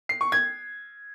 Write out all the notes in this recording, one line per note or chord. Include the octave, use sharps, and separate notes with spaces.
C7
C#6
G#6